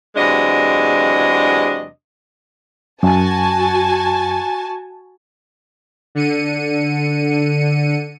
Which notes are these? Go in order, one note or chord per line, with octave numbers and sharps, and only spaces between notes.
E2 C3 F#3 G#3 D4 D#5
F#2 F#4 G#5 A5
D3 C#7 D#7